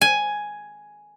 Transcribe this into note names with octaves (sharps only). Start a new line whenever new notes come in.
G#5